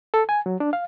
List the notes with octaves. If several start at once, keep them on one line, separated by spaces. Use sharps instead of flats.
A4
G#5
F#3
D4
F5